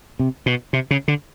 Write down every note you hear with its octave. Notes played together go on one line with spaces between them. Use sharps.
C3
B2
C3
C#3
D3